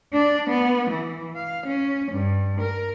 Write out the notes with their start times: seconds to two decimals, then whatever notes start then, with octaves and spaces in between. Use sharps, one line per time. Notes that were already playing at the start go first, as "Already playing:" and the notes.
0.13 D4
0.50 B3
0.91 E3
1.36 F5
1.67 C#4
2.12 G2
2.61 A#4